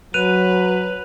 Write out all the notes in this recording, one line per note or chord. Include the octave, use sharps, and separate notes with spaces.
F#3 B4 F#6 D#7 F7